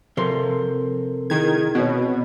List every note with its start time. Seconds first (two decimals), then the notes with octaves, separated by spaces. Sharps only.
0.17 C3 F3 C4 A4 A#4 C6
1.30 D#3 D#4 E4 G#4 G#6
1.75 B2 C4 C#5